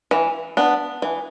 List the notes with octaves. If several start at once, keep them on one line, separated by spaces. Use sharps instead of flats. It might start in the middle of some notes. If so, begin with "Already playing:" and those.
E3
B3 D4
E3